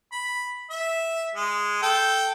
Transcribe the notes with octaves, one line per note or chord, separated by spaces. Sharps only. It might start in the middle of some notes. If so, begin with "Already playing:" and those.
B5
E5
G#3
A4 G5